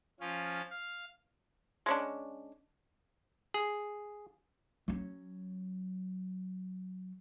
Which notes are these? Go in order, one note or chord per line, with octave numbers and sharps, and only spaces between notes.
F3 C#4 F4
F5
G#3 C#4 D4
G#4
F#3 C#4